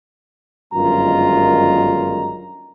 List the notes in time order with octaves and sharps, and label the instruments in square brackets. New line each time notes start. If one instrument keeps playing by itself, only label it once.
[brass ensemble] G1 F#2 D#3 G#3 F4 A#5